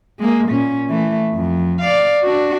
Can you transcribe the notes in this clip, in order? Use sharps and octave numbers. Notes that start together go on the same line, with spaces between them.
G#3 A#3
A#2 C#4
E3 A3
F2
D5 F5
D4 F#4